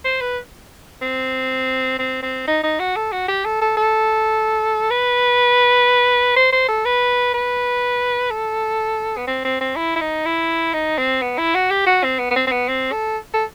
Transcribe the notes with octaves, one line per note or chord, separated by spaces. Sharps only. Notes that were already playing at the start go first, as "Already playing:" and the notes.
C5
B4
C4
C4
C4
D#4
D#4
F#4
A4
F#4
G4
A4
A4
A4
B4
C5
C5
A4
B4
B4
A4
B3
C4
C4
C4
E4
E4
D#4
E4
D#4
C4
B3
E4
F#4
G4
F#4
C4
B3
B3
C4
C4
B3
C4
A4
A4